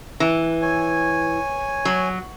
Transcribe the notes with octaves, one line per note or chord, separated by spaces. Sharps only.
E3
C#5 G#5
F#3